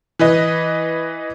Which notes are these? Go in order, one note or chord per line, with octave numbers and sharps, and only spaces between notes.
E3 B4 D#5